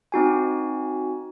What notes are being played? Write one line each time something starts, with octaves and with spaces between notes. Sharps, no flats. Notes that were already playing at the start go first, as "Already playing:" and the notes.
C4 D#4 F#4 G#5